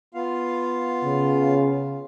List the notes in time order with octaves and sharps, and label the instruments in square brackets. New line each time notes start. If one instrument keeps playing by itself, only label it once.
[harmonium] B3 F4 F5
[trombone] C#3